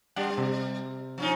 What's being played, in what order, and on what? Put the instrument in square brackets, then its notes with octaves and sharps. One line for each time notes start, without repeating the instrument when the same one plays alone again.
[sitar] G3 [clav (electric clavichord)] D4 G4 F#5
[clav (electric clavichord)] C3
[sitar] F3 C#4 D#4